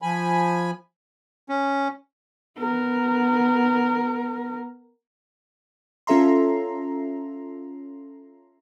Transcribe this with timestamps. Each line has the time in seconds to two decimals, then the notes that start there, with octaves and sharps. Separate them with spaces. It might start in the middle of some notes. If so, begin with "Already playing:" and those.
0.02 F3 G#5 B5
1.49 C#4
2.59 B3 A#4
6.07 C#4 F4 A4 E5 A#5 C6